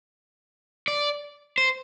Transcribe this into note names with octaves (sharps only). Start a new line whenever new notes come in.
D5
C5